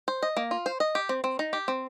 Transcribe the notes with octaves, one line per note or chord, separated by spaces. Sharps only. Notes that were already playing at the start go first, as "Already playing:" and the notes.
C5
D#5
A#3
F4
C5
D#5
G4
C4
C4
D#4
G4
C4